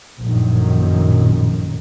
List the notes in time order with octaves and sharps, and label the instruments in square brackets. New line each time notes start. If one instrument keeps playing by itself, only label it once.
[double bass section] A#1 F#2 A2 D#3